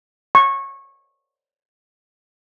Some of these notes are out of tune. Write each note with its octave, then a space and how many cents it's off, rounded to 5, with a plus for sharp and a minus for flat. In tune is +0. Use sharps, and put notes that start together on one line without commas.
C#6 -20